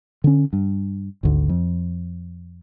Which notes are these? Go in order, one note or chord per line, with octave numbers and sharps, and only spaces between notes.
D3 C#4
G2
G#1 D2
F2